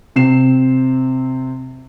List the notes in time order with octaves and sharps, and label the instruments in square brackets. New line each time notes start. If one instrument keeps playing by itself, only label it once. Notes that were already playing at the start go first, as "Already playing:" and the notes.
[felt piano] C3 C4 C7 E7